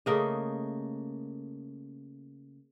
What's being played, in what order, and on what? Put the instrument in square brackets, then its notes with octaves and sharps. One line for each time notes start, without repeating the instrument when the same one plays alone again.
[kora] C#3 A3 A#3 D#5